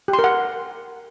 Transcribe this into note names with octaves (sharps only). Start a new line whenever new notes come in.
G4
C6
A#4
F#5